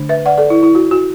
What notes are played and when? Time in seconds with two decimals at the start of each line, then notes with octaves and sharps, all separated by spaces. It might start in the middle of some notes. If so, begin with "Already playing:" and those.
Already playing: D3 A3 D4
0.09 B4 E5
0.26 D5 F#5
0.38 A4 D5
0.50 E4
0.63 E4
0.75 F#4
0.91 F#4